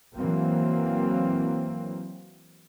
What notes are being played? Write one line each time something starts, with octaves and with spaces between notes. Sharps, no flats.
E3 F#3 A#3 C4